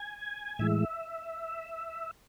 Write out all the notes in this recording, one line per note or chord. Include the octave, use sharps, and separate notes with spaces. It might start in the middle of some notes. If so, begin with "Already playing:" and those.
Already playing: G#5
A2 E3 G#3 E5